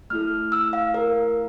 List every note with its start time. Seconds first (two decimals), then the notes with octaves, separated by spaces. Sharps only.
0.10 A3 E4 A4 F6
0.52 E6
0.73 F5
0.94 A#4